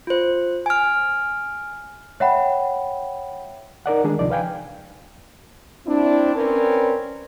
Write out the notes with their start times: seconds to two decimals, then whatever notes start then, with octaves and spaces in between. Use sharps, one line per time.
0.07 F4 C5
0.66 G#5 F6
2.20 C#5 E5 F#5 G5 B5
3.86 D#4 A#4 D5 F#5
4.04 D#3 G#3 D4 G#4
4.19 C#2 C3 F3 D#4 D5
4.30 B4 F5 G5 G#5
5.86 C4 D4 E4
6.34 C4 C#4 A#4 B4 C#5 D5